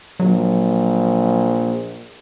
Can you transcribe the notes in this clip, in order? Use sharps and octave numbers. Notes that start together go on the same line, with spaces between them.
A#1 F#3